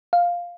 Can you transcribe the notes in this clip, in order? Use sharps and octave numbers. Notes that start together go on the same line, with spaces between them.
F5